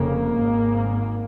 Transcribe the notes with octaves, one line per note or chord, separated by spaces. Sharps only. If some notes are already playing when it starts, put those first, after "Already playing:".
Already playing: F1 F2 C#3 A#3
G#1 G#2